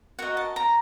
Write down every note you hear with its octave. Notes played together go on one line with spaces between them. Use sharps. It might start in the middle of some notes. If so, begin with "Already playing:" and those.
F#4 A#4 D#5 F#5
A5
A#5